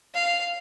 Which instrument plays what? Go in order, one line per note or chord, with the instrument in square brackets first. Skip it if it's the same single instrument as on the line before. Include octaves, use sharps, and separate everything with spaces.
[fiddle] F5